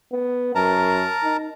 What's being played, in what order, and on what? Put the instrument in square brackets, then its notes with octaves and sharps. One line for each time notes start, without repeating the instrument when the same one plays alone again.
[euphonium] B3
[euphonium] F#2 [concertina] A#4 A5 A#5
[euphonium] D#4